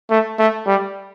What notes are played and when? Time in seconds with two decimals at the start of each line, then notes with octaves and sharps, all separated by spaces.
0.11 A3
0.39 A3
0.67 G3